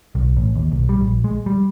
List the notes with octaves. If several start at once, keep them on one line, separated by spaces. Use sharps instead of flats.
B1
A1
D#2
B1
G3
A#1
G#3
G3